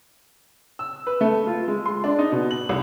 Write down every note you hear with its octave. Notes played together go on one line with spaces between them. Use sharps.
E6
B4
A3
F4
G#3
C6
D4
D#4
B2
F#7
C2